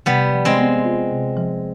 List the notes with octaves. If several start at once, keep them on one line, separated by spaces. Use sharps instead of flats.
C3 G3 B3
F3
G#3 C4
B3
F4
C3
F3